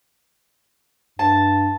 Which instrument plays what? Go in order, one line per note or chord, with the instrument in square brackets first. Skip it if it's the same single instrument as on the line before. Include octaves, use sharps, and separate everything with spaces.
[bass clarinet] G2 [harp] A5